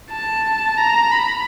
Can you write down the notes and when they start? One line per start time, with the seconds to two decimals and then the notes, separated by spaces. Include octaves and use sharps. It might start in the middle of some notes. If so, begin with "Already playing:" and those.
0.11 A5
0.78 A#5
1.12 B5